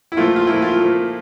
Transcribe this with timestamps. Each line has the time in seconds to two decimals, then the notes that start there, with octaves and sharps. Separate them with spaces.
0.12 E4
0.17 A#2 F3 A3 F4
0.36 F4
0.47 A#2 F3 A3 E4
0.62 F4
0.77 A#2 F3 A3